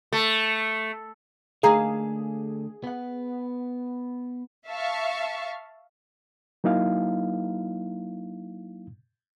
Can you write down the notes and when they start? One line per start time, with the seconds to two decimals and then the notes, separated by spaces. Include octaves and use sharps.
0.12 A3
1.63 D3 A3 A#3 D#4 G#4 F5
2.84 B3 F#5
4.69 E5 F5 A5 C#6
6.64 F#3 A#3 D#4 E4 F5